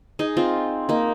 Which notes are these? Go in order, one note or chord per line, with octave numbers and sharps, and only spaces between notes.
D#4 G#4
C4 F4
A#3 D#4